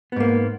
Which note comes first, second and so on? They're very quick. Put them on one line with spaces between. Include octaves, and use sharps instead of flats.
B3 G#2 A#3